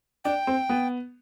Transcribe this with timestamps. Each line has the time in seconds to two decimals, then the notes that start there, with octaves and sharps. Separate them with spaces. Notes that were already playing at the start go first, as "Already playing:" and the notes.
0.25 D4 G5
0.47 C4
0.69 B3